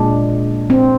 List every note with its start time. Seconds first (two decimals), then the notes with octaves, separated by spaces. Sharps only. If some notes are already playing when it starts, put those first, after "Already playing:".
Already playing: A#2 G#3 D4
0.70 C4